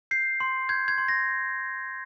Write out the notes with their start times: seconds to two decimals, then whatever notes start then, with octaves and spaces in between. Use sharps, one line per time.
0.11 G6 C7
0.40 C6
0.69 G6 G#6
0.88 G#6
0.98 C6
1.08 A#6